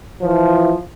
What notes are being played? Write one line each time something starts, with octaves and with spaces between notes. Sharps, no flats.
E3 F3